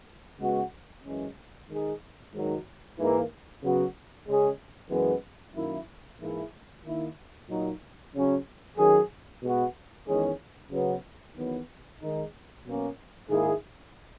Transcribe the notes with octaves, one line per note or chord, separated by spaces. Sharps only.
C#3 G#3 B3 F#4
F#2 E3 G#3 C#4
D#3 G#3 D#4 G#4
G#2 D#3 F#3
G#2 E3 A#3
C#3 F#3 B3 F#4
C#3 G#3 C#4 G#4
F#2 E3 G#3 B3
F#2 D#3 A#3 E4
G#2 E3 A#3 E4 G#4
D#3 A#3 E4
A#2 F#3 A#3 D#4
C#3 F#3 C#4
D#3 F#3 C#4 G#4
B2 G#3 B3 F#4
E2 D#3 G#3 C#4 G#4
C#3 F#3 B3
E2 D#3 F#3 B3
D#3 G#3 D#4
B2 F#3 A#3 C#4
G#2 D#3 A#3 E4 G#4